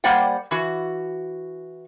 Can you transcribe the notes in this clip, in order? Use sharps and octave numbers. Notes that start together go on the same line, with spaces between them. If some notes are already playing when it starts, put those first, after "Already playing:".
G3 A#3 C5 D5 F#5 G5
E3 F#4